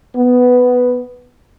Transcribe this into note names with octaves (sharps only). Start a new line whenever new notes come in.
B3